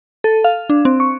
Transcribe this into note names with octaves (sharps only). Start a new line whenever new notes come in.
A4
F5
D4
C4
C#6